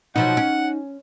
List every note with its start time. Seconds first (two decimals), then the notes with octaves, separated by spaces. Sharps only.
0.16 B2 F3 F#3 D#4 F#5
0.37 C#4